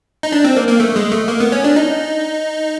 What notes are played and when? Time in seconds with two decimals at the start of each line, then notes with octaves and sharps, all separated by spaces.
0.23 D#4
0.32 D4
0.44 C4
0.56 A#3
0.68 A#3
0.80 A3
0.96 G#3
1.12 A3
1.28 A#3
1.40 B3
1.52 C#4
1.64 D4
1.76 D#4